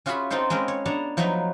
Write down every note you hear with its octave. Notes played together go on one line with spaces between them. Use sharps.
C#4 F4 F#4 G#4 E5 B5
C4 D#4 F4 A4 C5
G#3 C4 C#4 A#4 B4
C#5
B3 D4 C#5 A5 A#5
F3 F#3 A3 D#4 F#4 B4